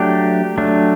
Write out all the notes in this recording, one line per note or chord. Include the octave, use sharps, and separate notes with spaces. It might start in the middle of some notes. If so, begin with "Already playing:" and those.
Already playing: F#3 A3 D4 G4
F#3 A3 D4